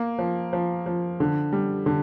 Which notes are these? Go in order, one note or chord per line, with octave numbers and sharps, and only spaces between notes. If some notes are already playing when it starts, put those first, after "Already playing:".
Already playing: A#3
F3
F3
F3
D3
G3
D3